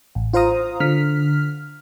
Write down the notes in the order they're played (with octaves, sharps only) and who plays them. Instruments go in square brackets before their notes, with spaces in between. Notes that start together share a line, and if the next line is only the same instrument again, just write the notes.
[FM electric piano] A1
F4 C5 F5 A#5 D#6
D3 F6 B6